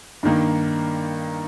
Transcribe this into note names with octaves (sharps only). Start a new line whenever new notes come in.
G2 D#3 A#3